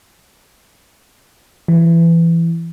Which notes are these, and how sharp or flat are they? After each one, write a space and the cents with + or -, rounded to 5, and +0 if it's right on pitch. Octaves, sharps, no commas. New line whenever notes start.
E3 +20